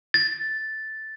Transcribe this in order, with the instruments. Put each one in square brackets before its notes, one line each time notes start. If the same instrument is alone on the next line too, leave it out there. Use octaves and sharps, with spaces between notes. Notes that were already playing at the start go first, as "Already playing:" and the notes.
[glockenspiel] A6